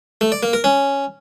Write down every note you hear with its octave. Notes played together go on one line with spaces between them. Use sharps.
A3
D5
A#3
A#4
C#4